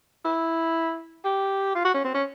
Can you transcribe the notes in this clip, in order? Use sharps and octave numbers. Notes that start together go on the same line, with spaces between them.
E4
G4
F4
F#4
C#4
C4
C#4